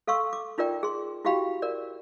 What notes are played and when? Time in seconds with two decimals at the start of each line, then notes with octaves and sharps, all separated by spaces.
0.07 A4 F5 C6 C#6 E6
0.33 D6
0.58 D#4 F4 A#4 D5 G5
0.83 G#4 C6
1.25 E4 F#4 G4 F5 G5 B5
1.62 A#4 D5